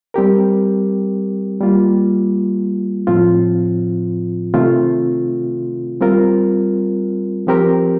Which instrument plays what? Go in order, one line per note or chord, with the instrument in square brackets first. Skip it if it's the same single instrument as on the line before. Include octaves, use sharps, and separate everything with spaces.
[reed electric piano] G3 C4 G4 A#4
G3 A#3 F4
A2 F3 C4 F4
C3 D#3 A3 C4 F4
G3 C4 F4 A#4
F3 C4 G4 A#4